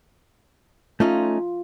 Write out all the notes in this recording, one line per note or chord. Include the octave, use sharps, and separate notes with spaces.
A3 C#4 D#4 F4